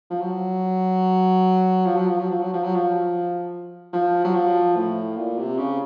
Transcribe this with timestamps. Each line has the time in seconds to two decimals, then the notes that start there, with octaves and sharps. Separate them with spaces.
0.10 F3
0.21 F#3
1.86 F3
1.97 F#3
2.08 F3
2.20 F#3
2.30 F3
2.42 F#3
2.53 F3
2.64 F#3
2.75 F3
3.93 F3
4.24 F#3
4.34 F3
4.76 A2
5.17 A#2
5.38 C3
5.58 C#3